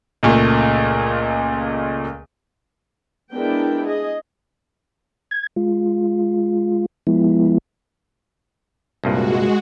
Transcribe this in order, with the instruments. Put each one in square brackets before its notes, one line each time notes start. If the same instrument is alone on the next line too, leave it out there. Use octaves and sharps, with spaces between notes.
[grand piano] C#2 A#2 A3
[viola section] G#3 B3 D4 E4 A#4 G5
G#4 D#5
[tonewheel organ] G#6
G#3 F4
F3 G#3 B3 E4
[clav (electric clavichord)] C2 G2 A#2 [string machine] G#3 F#4